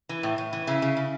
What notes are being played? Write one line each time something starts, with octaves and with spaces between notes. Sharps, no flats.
E3
A2
A2
E3
C#3 E4
C#3
C#3